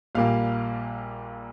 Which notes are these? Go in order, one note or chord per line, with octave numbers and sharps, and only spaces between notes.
A#1 A#2 G3 A#3 F5